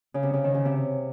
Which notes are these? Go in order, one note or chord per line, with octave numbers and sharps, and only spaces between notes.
C#3
C3
C#3
D#3
C#3
C3